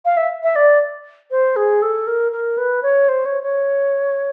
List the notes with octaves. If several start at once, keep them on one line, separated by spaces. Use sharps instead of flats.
F5
E5
E5
D5
C5
G#4
A4
A#4
A#4
B4
C#5
C5
C#5
C#5